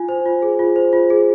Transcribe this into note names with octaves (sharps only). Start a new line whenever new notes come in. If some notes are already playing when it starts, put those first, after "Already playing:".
Already playing: F4 G#5
C5
F4
G#4
F4
C5
F4
G#4